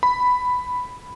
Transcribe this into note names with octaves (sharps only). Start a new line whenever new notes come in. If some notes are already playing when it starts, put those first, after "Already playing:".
B5